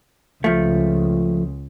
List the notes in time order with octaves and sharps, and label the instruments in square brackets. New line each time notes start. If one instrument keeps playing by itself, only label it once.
[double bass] C#2 [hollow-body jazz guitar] F3 A3